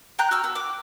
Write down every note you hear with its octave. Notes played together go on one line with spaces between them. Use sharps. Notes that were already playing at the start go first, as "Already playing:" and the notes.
G5 A#5 F#6 G6
F#4 E6 F6
B3 E6
D6